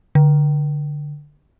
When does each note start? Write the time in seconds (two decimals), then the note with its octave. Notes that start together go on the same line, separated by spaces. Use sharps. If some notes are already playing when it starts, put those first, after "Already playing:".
0.15 D3